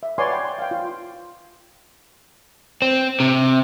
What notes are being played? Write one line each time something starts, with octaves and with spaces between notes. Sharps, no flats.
E5
B4 C#5 D5 F#5 G#5 C6
G5
C6
F5 G5
F4
C4
C3